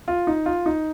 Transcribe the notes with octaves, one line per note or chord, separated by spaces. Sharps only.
F4
D#4
F4
D#4